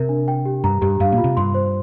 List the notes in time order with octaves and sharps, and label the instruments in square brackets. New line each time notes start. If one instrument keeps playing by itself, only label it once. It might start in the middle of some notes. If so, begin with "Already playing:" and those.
Already playing: [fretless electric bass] C3 [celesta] A#4
[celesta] D4
G5
G4
[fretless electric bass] G2 [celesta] A#5
[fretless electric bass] G2 [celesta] G4
[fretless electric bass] G2 [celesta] F5
[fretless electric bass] A#2
[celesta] F4
[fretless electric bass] C3
[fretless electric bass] G2 [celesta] C6
[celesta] C5